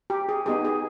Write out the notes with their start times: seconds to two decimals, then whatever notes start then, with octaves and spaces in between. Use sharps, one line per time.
0.10 G4
0.29 G#4
0.46 B3 D#4 G4 G#4
0.65 G#4